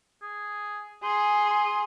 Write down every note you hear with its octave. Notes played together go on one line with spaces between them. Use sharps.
G#4
G#4 C6
C6